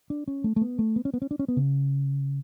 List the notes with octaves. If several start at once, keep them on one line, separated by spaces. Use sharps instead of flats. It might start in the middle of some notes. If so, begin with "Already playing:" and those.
D4
C#4
A3
A3
B3
A3
B3
C#4
B3
C#4
D4
C#4
B3
C#3